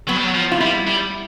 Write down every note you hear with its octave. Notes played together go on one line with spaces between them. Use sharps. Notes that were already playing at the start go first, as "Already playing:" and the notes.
F#3 B3
G3
F#3
F3
F4
G3 E4
G3